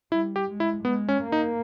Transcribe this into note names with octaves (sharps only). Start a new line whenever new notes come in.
G3 E4
G4
G#3
E4
G#3 B3
C#4
A#3
D#4